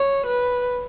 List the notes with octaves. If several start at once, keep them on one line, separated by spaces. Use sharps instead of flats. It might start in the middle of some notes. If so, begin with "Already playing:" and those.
Already playing: C#5
B4